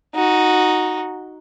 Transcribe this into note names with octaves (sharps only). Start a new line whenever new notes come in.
D#4 F#4